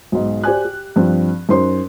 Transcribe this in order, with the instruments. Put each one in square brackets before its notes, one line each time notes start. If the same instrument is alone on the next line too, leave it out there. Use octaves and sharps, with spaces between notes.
[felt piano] B1 G#2
G4 C5 D5 G#5 F#6
G4
G2 F3 C4
F#2 D#4 C5 C6